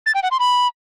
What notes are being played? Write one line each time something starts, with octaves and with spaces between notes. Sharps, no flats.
A6
G5
F#5
C6
B5